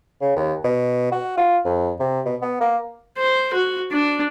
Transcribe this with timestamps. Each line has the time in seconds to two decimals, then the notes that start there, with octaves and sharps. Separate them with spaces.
0.21 C#3
0.36 D#2
0.64 B2
1.12 F#4
1.37 F4
1.65 F2
2.00 C3
2.26 B2
2.42 B3
2.60 A#3
3.18 C5
3.54 F#4
3.92 D4